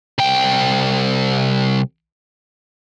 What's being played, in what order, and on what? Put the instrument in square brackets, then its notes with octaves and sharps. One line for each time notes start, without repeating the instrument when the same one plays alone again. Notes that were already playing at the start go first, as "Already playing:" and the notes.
[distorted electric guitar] C2 G5